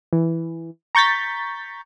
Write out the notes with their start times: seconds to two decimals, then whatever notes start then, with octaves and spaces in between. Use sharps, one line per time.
0.13 E3
0.95 A#5 C#6 G6 A6 B6